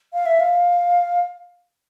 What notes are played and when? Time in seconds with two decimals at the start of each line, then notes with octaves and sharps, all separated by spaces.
0.13 F5
0.26 E5
0.40 F5